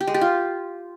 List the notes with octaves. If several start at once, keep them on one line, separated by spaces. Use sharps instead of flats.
G4
G#3
G4
F4